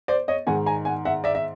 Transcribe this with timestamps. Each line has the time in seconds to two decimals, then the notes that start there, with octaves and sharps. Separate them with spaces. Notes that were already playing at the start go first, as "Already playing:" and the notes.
0.08 C5 D5
0.28 C#5 D#5
0.47 G#2 D#3 F#5 G#5
0.66 G#5 A#5
0.85 F#5 G#5
1.05 E5 F#5
1.24 D5 E5
1.35 E5